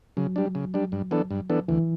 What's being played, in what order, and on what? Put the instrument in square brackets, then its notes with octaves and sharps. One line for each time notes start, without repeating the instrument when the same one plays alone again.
[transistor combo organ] C#3 [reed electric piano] F#3
[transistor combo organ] G3 D4
C#3
G3 D4
G2
E3 B3 D4 A4
G2
E3 B3 D4 A4
[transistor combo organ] D2 [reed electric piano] E3